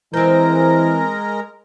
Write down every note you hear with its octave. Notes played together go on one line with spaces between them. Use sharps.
E3 G#3 C4 A#4 C5 A#5